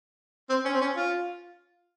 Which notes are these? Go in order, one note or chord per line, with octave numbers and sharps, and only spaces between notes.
C4
C#4
C4
C#4
F4